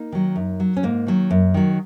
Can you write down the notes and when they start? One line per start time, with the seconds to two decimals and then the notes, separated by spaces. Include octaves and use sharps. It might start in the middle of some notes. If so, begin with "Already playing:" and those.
Already playing: A#3 D#4
0.12 D#3 F#3
0.36 F#2
0.60 F#3
0.77 C#4
0.83 G#2 A#3
1.07 D#3 F#3
1.31 F#2
1.54 D#3 F#3